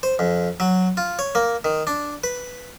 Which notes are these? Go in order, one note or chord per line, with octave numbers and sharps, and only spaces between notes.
C5
F2
F#3
F4
C#5
A#3
D#3
D4
B4